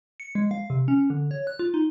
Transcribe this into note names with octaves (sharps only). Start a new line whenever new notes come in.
C#7
G#3
F5
C3
C#4
D3
C#5
F#6
F4
D#4